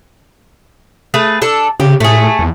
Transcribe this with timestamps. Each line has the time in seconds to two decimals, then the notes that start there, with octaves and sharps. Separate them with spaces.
1.14 A3 G#4 B4
1.42 D4 A4
1.80 C#3 G4
2.00 A2 A3 G#4
2.39 E2